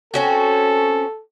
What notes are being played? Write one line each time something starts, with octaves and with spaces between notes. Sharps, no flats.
C4 C#4 F#4 A4